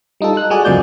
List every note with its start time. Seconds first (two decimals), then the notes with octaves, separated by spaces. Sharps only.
0.21 G3 D#4 F4 A4
0.37 F#6
0.50 G#3 F#4 G#4 D5
0.65 C#2 F#2 F3 A#3 D5 G6